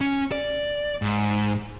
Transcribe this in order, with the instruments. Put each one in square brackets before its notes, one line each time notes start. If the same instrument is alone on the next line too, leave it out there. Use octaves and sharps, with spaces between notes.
[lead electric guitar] C#4
D5
G#2